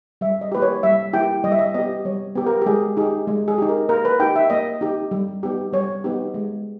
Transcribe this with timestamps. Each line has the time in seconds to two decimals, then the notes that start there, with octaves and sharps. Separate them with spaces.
0.21 G3 E5
0.41 D#5
0.52 A#3 E4 G4 B4
0.62 C#5
0.83 G3 E5
1.13 A#3 E4 G4 G5
1.44 G3 D#5
1.52 E5
1.59 D#5
1.74 B3 G4 D#5
2.05 G3 C#5
2.35 B3 G4
2.47 A#4
2.62 G4
2.66 G#3 G#4
2.97 D#4 G4 G#4
3.27 G#3
3.48 G#4
3.58 D#4 G4
3.69 A#4
3.89 A#3 A#4
4.05 B4
4.20 D#4 G4 G5
4.36 E5
4.50 A#3 D#5
4.81 D#4 G4
5.11 G3
5.43 B3 D#4 G4
5.73 G3 C#5
6.04 B3 D#4 G4
6.34 G#3